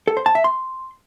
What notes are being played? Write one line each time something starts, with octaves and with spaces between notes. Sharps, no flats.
A4
C5
A5
E5
C6